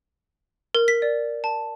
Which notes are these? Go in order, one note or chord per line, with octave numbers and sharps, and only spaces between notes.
A#4
B6
D5
A5